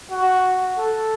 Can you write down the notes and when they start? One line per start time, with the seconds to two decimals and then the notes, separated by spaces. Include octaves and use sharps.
0.11 F#4
0.78 A4